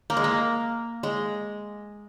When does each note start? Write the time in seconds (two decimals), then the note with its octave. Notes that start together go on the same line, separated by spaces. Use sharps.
0.10 A#3
0.17 G#3
0.24 A#3
1.03 G#3